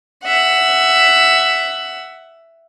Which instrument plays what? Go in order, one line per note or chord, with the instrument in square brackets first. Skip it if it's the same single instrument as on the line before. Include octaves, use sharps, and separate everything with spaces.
[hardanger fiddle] E5 F#5